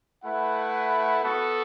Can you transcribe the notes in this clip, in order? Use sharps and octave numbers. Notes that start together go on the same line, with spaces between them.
A3 E4 B4 F#5
B3 F#4 A4